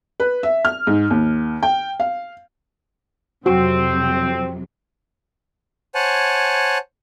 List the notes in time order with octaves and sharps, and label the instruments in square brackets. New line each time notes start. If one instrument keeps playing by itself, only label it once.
[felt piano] B4
E5
F6
G#2
D#2
G5
F5
[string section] F2 C3 F#3 [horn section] C4 [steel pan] F#4
[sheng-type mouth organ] C5 C#5 F#5 G#5 A5